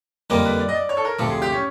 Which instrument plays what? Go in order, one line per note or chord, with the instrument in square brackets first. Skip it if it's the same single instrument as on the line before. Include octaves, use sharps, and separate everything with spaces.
[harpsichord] F2 D3 G3 A#3 D#4 [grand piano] A#4
[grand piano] B4
D5
D#5
D5
C#5
A4
A#4
[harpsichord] D2 C3 F3 [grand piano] A4
[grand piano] G#4
G4
C#4